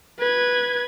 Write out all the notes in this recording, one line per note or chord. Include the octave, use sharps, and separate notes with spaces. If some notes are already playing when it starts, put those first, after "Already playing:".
B4 G#6